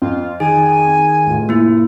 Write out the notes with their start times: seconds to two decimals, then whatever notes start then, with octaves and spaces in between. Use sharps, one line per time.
0.02 F2 F4
0.40 D#3 G#4 G#5
1.26 F1 A2 F4
1.49 A#3 E4